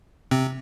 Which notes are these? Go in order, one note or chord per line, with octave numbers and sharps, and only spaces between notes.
C3 C4